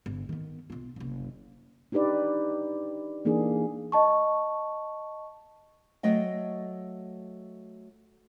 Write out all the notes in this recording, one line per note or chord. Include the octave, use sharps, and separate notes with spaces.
G1 D3
D#3 B3
B1 F4
F#1 C2
D4 D#4 G4 B4 D5
E3 A#3 D4 D#4 G#4
D#5 A5 C#6
F#3 A3 D#5 G5